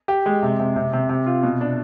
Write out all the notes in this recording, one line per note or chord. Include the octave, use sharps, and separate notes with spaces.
G4
G#3
C3
C3
C3
C3
C3
F4
B2
D4